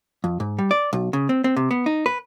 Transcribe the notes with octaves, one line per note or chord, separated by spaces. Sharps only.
F2
G#2
G3
D5
B1
C#3
C4
C4
C3
B3
D#4
B4